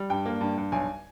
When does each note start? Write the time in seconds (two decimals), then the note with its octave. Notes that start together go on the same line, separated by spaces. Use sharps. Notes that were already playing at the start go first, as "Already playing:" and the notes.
Already playing: G3
0.10 G2 G5
0.26 A#3
0.41 G2
0.57 G2
0.72 B1 G#5